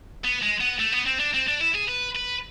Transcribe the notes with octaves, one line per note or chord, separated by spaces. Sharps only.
B3
G#3
B3
A3
B3
C4
D4
C4
D4
E4
G#4
B4
B4